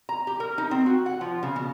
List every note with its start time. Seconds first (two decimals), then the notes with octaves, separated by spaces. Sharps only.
0.09 A#5
0.27 G4
0.40 A#4
0.58 D#4
0.71 C4
0.86 F#4
1.06 F#5
1.21 F3
1.43 C#3
1.56 B2